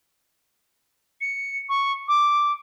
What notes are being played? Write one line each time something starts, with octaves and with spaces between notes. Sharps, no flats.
C#7
C#6
D6